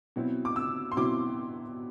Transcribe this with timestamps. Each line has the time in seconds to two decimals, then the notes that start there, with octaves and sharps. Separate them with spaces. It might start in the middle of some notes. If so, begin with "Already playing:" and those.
0.16 B2 F#3 C4 E4
0.45 D6
0.56 E6
0.92 C6
0.96 B2 F#3 C4 E4 D6